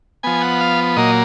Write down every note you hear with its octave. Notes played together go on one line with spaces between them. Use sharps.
F3 B3 G#5
F#5
F5
A#2 F#3 A#3 D#5